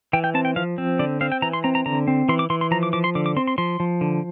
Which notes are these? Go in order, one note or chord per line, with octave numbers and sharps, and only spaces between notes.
E3 G5
G5
C4 A5
G5
F3 F5
C4
D3 D5
C4 F5
G5
E3 A#5
C6
C4 A#5
A#5
D3 A#5
C4
E3 C6
D6
E3 C6
C6
F3 A#5
D6
F3 D6
C6
D3 D6
D6
C4 C6
C6
F3 C6
F3
D3